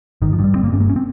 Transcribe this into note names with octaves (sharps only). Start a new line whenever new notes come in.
G1 D#3
F3
G2
G3
G1 C4
A#3
G2 C#4
A#3
C#4
C4